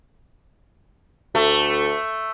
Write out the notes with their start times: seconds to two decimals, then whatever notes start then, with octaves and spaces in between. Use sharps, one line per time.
1.35 D2 A3